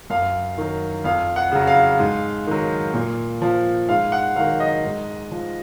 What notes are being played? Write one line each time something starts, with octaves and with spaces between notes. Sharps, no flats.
F#2 F5
D#3 F#3
F2 F5
F#5
C#3 F#3
F5
G#2
D#3 F#3
A#2
F3
G#2 F5
F#5
D#3 F#3 F5
D#5
G#2
F3